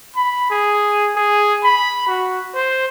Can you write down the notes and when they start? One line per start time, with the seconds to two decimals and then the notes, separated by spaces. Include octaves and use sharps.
0.16 B5
0.51 G#4
1.16 G#4
1.65 B5
2.07 F#4
2.55 C5